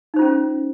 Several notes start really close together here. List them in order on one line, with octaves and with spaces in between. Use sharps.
D#4 C5 F4 C#4